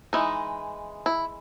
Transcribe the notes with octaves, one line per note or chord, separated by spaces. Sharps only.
E3 G#3 D#4
E4